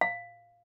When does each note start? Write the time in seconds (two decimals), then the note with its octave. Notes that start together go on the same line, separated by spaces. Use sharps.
0.01 F5